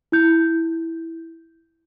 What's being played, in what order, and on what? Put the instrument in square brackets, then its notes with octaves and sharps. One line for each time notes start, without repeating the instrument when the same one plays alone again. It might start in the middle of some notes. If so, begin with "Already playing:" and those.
[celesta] E4 G6